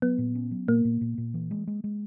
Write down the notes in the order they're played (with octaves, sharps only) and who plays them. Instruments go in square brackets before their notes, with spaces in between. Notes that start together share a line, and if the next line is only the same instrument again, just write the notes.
[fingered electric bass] F#3 [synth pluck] B3
[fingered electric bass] A#2
C#4
F#3
[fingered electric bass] A#2 [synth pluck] A#3
[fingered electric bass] A#2
A#2
A#2
E3
G#3
G#3
G#3